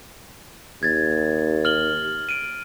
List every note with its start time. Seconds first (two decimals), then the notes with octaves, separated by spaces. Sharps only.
0.83 D#2 G#6 A6
1.65 F6 F#7 G7
2.29 D7 D#7